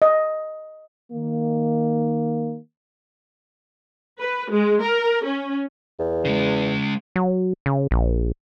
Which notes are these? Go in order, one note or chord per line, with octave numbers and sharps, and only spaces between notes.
D#5
D#3 A#3
B4
G#3
A#4
C#4
E2
C#3 G#3
F#3
C#3
A#1